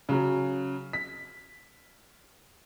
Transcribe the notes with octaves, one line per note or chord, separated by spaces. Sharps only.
C#3 F#3
B6